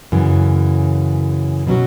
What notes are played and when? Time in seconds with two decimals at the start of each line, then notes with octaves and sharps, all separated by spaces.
0.12 F#2 C#3 E3
1.67 B2 F#3 C#4 F#4